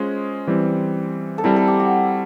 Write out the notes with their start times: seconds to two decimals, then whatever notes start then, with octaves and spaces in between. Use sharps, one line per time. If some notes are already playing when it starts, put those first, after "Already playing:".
Already playing: G#3 C#4 F4 G#4 C5
0.47 E3 G3 C4
1.38 A4
1.44 G3 C4 E4 A#4
1.56 A4
1.68 G4
1.80 F#4